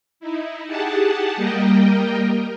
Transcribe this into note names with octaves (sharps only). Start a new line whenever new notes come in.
D#4 E4
G4 G#4 F#5 A5
G3 A#3 A#4 D#5 G5